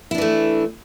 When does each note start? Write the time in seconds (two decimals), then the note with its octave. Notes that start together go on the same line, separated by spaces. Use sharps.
0.11 E4
0.15 D4
0.18 E3
0.22 A3